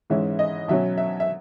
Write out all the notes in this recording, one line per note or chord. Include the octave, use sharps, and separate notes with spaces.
G#2 E3 G#3 C#4 E4 E5
D#5
B2 F#3 C#4 E5
E5
E5